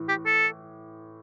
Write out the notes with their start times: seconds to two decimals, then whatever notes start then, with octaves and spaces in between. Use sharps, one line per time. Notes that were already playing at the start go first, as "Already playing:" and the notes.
Already playing: A2 E3
0.08 G4
0.26 A4